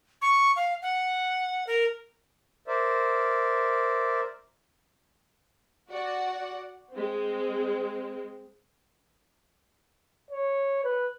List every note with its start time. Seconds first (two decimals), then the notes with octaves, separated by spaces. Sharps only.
0.22 C#6
0.56 F5
0.82 F#5
1.67 A#4
2.68 A#4 C5 D5 E5
5.89 F#4 D5 F#5
6.92 G#3 C4
10.31 C#5
10.84 B4